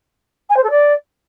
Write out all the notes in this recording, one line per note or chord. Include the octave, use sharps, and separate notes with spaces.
G#5
C5
A4
D5